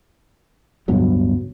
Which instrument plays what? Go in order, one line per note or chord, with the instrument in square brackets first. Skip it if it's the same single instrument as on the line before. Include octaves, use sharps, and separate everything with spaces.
[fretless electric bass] D1 G2 B2 F#3